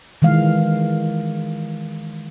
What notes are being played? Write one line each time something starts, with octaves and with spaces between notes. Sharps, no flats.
D#3 E3 G#3 F5